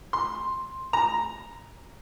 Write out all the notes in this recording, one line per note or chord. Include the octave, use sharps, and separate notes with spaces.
C6
A#5